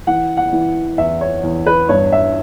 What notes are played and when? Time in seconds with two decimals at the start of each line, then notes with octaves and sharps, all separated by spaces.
0.07 E3 F#5
0.37 F#5
0.53 E3
0.98 E2 E5
1.21 C#5
1.43 E2
1.66 B4
1.89 G2 C#5
2.12 E5